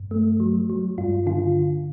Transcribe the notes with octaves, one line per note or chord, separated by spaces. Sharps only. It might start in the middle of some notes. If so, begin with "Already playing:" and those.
Already playing: G2
A3
F#3
F#3
G2 F4
D3 F4